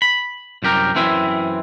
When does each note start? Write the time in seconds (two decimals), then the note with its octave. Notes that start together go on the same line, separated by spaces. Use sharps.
0.02 B5
0.63 C2 F#2 G4 A#4
0.95 F#2 E3 C4 E4